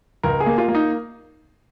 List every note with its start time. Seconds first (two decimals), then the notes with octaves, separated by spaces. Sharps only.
0.23 C#2 A#4
0.40 G#4
0.46 A#3
0.58 F4
0.68 A#3
0.75 D#4